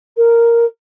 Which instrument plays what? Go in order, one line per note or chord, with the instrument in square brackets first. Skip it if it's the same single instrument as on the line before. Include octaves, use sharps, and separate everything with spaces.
[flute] A#4